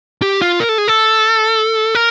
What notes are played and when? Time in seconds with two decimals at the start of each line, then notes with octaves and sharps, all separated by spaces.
0.22 G4
0.42 F4
0.60 A#4
0.69 A4
0.78 G#4
0.88 A4
1.95 A#4